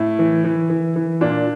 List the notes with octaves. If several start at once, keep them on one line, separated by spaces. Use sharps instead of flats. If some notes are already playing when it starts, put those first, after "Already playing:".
Already playing: A2 E4
E3
E3
E3
E3
A#2 D4